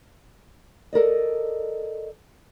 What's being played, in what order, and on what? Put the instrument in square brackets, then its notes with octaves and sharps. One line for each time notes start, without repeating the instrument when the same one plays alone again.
[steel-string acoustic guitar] A4 A#4 D5 D#5